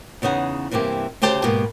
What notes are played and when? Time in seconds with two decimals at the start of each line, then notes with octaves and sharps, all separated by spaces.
0.22 E2 C#3 B3 D#4 F#5
0.71 G2 C3 E3 A#3 G4
1.22 D2 C#3 G4 C5 A5
1.43 G#2 B2 A#3 B3 G4